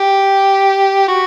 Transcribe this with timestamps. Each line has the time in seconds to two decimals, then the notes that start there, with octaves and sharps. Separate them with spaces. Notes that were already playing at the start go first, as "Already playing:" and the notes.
Already playing: G4
1.08 F#4